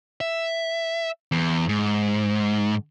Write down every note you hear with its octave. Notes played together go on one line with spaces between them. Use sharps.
E5
E2
G#2